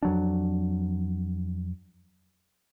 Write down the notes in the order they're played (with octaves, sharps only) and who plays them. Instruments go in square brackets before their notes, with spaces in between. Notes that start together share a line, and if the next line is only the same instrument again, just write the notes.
[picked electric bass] F2 F#3 D4